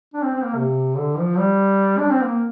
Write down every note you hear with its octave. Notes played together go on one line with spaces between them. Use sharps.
D4
C4
C4
A#3
C3
D3
F3
G3
D4
C4
A#3